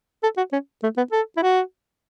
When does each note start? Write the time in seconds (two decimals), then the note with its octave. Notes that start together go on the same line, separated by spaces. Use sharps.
0.23 A4
0.37 F#4
0.53 C#4
0.83 A3
0.97 B3
1.12 A4
1.37 E4
1.43 F#4